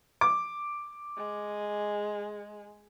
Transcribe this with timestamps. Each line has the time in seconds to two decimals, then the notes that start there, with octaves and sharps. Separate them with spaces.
0.21 D6
1.17 G#3